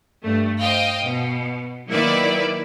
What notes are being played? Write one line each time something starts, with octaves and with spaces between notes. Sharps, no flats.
G2 A3
C5 D#5 F5 G5
B2
D#3 F#3 A#3 E4 B4 D5